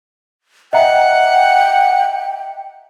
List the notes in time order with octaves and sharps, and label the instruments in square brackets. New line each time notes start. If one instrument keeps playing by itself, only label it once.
[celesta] D#5 E5 A#5 [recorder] F#5 [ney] G5